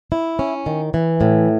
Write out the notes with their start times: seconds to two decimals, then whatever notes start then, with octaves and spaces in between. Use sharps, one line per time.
0.12 E4
0.39 C#4
0.66 D#3
0.94 E3
1.21 A2